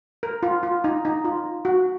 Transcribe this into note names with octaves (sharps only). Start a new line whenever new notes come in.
A#4
F4
F4
D#4
D#4
F4
F#4